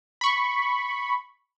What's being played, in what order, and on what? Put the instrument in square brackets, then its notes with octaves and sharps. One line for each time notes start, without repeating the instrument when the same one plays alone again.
[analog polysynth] B5 C#6